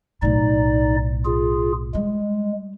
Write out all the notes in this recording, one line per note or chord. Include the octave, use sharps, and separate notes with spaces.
B1 A2 D#4 D5
F4 G#4
G3 G#3